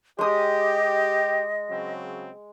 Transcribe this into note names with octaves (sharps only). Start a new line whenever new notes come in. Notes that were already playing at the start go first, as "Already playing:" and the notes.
G#3 G4 D#5 D#6
C#3 F#3 C4